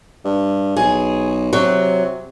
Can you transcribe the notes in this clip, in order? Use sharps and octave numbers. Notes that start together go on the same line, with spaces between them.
G2
B1 G#4
C3 F#3